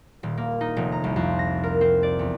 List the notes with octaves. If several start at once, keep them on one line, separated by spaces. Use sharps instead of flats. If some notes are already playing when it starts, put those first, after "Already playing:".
D#1
A#3
D#4
F1
A#5
C2
F2
A#6
A#4
C4
D5
E2